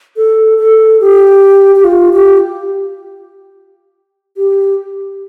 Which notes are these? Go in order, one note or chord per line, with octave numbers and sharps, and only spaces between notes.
A4
A4
G4
G4
F4
G4
G4